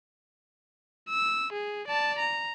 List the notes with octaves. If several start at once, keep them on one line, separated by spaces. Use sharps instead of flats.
E6
G#4
D5 A5
A#5